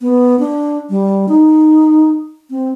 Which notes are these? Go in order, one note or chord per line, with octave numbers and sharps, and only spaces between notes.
B3
D4
G3
D#4
C4